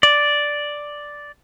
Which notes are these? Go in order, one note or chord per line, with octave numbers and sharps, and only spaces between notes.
D5